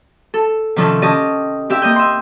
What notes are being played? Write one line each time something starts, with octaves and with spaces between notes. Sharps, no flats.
A4
C3 D#3 F3 C#4 A4
C#4 G4 D#5 A5
C4 G4 E5
A#3 D#5 D#6 G6
E5 C6